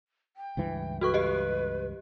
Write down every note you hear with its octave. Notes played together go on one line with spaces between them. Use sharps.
G5
C#2 G2 E3
F#4 A4 B4 C#6
G4 D#5